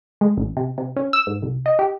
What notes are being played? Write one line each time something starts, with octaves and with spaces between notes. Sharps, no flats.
G#3
A1
C3
C3
C#4
E6
G#2
C2
D#5
G4